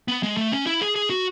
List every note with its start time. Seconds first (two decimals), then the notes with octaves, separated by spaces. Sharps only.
0.08 B3
0.23 G#3
0.37 A3
0.52 C#4
0.66 E4
0.81 G#4
0.96 G#4
1.10 F#4